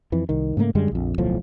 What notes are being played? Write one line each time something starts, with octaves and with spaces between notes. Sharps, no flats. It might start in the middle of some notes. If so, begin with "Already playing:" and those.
F2 E3
C2 D#3
G#2 C#3 A3 A#3
F#2 D3 G3 G#3
A#1 F2
D1 B1 A2 F3